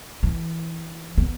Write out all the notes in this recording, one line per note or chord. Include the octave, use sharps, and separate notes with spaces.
E3
B3